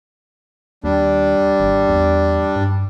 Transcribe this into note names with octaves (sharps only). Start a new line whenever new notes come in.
D#2 G3 D4
G#1
E2
G2